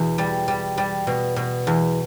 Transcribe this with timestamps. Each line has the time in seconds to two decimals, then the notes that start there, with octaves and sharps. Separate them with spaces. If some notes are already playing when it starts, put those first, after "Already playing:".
Already playing: E2 B2
0.18 G3
0.48 G3
0.78 G3
1.07 B2
1.36 B2
1.67 E2